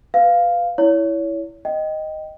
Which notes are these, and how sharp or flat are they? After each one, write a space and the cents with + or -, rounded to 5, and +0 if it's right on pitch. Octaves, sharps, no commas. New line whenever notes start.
B4 +5 F5 +0
E4 +0 C#5 +25
D#5 +0 G5 -10